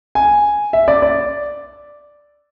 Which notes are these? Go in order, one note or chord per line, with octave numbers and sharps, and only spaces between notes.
G#5
E5
D5
D5